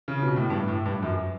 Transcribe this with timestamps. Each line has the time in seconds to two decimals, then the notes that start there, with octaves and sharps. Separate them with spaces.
0.08 C#3
0.23 B2
0.36 A2
0.50 G2
0.68 A2
0.85 G2
1.03 F#2